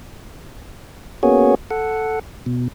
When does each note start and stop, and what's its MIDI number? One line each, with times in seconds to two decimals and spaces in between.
1.23 1.55 58
1.23 1.55 59
1.23 1.55 61
1.23 1.55 66
1.23 1.55 68
1.23 1.55 73
1.71 2.19 69
1.71 2.19 78
2.46 2.68 47